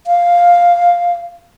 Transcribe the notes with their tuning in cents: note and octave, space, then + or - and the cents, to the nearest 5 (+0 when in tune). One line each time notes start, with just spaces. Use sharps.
F5 +5